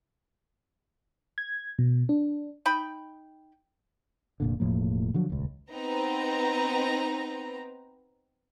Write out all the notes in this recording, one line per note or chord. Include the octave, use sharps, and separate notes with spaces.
G#6
B2
D4
D#4 G5 B5
F1 A#2 D3
E1 A2 F3 A#3
D3 F3 F#3
D#1 C#2
B3 C4 D#4 B4 A#5